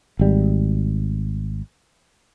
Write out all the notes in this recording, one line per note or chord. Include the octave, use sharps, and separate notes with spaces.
G#1 G3